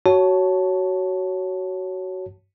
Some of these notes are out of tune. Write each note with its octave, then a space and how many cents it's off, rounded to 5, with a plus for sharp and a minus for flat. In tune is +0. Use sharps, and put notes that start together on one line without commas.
F#4 +20 C#5 +5 A5 +0